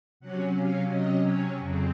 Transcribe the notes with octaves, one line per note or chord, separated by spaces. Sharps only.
C3 F#3 C#4 F#5
F5
D#5
C#5
F2 C#3 F#3 C4